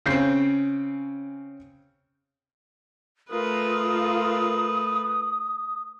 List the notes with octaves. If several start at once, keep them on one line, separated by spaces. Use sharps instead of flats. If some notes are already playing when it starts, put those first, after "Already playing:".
C#3 C4 C#4 G6 C7
A3 F4 A#4 B4 D#6